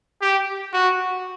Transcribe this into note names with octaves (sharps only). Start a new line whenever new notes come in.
G4
F#4